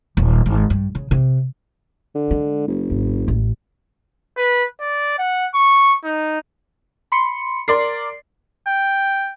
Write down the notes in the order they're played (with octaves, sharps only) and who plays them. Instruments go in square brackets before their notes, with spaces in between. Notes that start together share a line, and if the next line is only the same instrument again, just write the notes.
[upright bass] D#1
G#1
G2
C#3
C3
[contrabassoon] D3
[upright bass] G#3
[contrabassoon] F#1
[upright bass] G#1
A1
[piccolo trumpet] B4
D5
F#5
C#6
D#4
[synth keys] B5 C6 C#7
[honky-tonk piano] A#4 D5 C6 [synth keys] C7
[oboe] G5